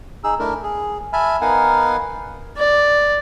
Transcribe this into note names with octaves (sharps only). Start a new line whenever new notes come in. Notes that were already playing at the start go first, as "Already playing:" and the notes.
D#4 G#4 E6
A3 D4 E4 A#4
G#4
E5 G#5 A5 B5 F6
B3 D#4 A#4 F5 F#5 G#5
D5